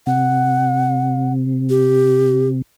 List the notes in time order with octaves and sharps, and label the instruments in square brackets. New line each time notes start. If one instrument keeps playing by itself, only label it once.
[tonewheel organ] C3 [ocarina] F#5
[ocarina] G4